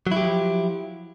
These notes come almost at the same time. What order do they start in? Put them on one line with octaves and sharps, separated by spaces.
F#3 E4 G4 F3